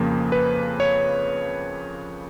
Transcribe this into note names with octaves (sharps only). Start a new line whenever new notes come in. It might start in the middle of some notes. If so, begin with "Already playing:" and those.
Already playing: F2 C#3 F3 A#3
B4
C#5